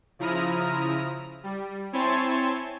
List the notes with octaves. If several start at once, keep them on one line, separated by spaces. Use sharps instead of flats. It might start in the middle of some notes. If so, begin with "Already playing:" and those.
C#3 F3 E4 A#5 D#6 F6
G3
C4 E4 C#5 G#5 A5 C6